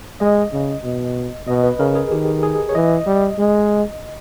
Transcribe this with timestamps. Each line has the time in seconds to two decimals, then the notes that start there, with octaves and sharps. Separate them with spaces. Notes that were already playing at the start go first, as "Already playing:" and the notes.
0.20 G#3 D#5
0.53 C#3
0.84 B2
1.47 B2 D#5
1.63 B4
1.79 C#3 A#4
1.95 G#4
2.12 D#3 G4
2.43 G#4
2.69 C#5
2.75 E3 D#5
3.07 G3
3.38 G#3